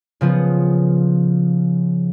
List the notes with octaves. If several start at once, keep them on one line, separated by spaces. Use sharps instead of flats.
C#3 F3 B3